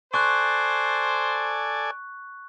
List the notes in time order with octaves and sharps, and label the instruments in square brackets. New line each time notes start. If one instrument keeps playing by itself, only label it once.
[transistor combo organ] A4 D5 G#5 [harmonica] C5 [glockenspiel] C#6 F#6